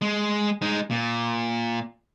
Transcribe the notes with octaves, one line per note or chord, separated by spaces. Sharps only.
G#3
G#3 D#4
A#2